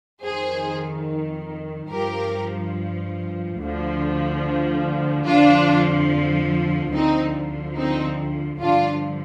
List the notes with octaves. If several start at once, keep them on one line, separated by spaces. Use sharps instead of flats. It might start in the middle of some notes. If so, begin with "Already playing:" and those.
F2 D#3 G#4 C5
G2 F3 G4 A#4
D2 D3 F3
F2 D3 F3 D4 F4
D2 D3 F3 C4 D#4
C4 D#4
G2 D3 F3 D4 F4